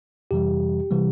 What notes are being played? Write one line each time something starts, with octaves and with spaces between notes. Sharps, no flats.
F2 C3 E3 G3 G4
C3 E3 G3